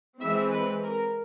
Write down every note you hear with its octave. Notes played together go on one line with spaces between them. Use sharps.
E3 G#3 C4 E5
B4
A#4